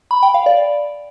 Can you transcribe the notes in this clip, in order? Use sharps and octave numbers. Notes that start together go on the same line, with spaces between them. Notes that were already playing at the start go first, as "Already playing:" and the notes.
B5
G5
F5
D5